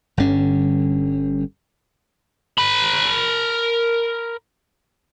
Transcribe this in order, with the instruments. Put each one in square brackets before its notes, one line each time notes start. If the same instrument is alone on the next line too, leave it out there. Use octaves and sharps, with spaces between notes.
[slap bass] G1 G2 D3 C#4
[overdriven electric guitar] A#4 B5